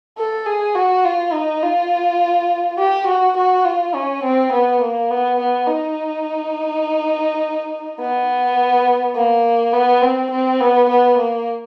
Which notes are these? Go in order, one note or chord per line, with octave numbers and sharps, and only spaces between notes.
A4
G#4
F#4
F4
D#4
F4
G4
F#4
F#4
F4
C#4
C4
B3
A#3
B3
B3
D#4
B3
A#3
B3
C4
C4
B3
B3
A#3